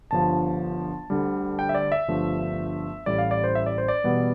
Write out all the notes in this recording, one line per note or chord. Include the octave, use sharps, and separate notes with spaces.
G1 G2 F3 A5
D2 D3 G3
G5
E5
D5
E5
G1 G2 F3 A3
A1 A2 G3 D5
F5
D5
C5
E5
D5
C5
D5
E2 B2 G3 B3